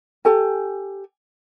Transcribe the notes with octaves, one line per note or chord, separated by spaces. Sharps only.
G4 A4 G#5